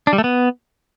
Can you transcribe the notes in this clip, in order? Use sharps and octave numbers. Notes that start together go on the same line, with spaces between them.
D4
G3
A3
B3